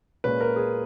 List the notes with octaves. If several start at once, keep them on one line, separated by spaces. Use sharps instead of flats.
A#2 G#3 C#4 B4
A#4
G#4